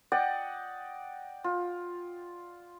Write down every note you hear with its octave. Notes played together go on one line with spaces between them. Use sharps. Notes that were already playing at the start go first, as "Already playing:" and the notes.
D5 D#5 F#5 G5
F4